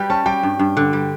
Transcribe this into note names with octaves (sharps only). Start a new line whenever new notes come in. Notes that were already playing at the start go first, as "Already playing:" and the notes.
Already playing: G3 B4 G5
C#4 A5
G3 G5
G2
G2
D3
G3